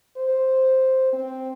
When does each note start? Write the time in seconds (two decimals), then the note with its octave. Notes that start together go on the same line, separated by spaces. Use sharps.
0.17 C5
1.13 C4